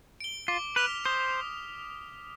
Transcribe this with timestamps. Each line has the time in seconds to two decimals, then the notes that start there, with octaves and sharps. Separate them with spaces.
0.20 D7 G7
0.48 F4 D6
0.76 B4 F6 B6 F7
1.05 C5 D#6